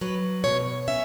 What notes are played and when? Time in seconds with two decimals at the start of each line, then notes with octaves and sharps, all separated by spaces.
0.01 F#3 B4
0.44 B2 C#5
0.88 C#4 E5